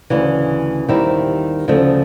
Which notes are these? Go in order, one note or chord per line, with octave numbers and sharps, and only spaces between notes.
D2 C#3 E3
D#2 D#3 G3 C4 E4
D2 C#3 F3 A3